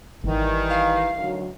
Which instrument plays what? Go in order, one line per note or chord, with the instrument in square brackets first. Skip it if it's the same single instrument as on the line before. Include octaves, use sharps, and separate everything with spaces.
[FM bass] G#1 [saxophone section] D#3 [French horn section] E3 G3
[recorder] F5
[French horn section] D2 D#3 F#3